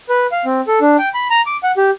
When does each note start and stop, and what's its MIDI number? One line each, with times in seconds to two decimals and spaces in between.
0.09 0.27 71
0.32 0.45 77
0.45 0.61 60
0.67 0.79 69
0.81 0.97 62
0.99 1.09 79
1.14 1.28 83
1.30 1.41 82
1.46 1.57 86
1.63 1.72 78
1.77 1.91 67